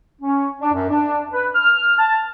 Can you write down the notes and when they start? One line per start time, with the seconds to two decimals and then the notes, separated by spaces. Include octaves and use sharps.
0.22 C#4
0.61 D4
0.74 F#2
0.90 D4
1.33 B4
1.55 F6
1.99 A5